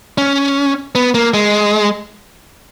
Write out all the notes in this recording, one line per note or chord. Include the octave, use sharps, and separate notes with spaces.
C#4
B3
A#3
G#3